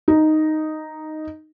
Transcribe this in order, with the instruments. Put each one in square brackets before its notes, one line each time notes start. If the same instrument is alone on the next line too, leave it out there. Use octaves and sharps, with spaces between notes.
[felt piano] D#4